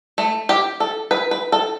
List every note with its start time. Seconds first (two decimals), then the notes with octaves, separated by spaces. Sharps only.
0.18 A3
0.49 G4
0.80 A4
1.11 B4
1.31 B4
1.52 A4